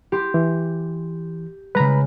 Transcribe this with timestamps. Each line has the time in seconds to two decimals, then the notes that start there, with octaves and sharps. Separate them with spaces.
0.12 G4 C6
0.34 E3
1.75 C#3 G#3 B4 A#5 B5